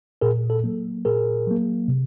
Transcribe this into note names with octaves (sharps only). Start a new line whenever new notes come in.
A#2 G#4 A#4
A4
F#3 A#3
A#2 G#4 A#4
F#3 A#3
C3